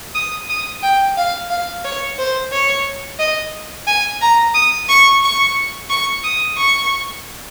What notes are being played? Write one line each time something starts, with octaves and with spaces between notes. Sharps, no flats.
D#6
D#6
G5
F5
F5
C#5
C5
C#5
D#5
G#5
A#5
D#6
C#6
C#6
C#6
D#6
C#6